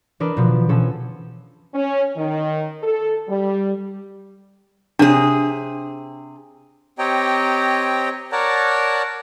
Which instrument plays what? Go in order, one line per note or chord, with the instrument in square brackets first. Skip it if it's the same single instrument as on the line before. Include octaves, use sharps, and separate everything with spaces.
[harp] E3 D4 A#4 B4 D5 D#5
B2 D3 F3
B2 F3 C#4 A4
[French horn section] C#4
D#3
A4
G3
[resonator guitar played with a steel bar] C3 G#4 [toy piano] D4 C#5
[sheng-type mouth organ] C4 G4 C#5 D#5 G5 A#5
A#4 C#5 D5 F#5 A5 A#5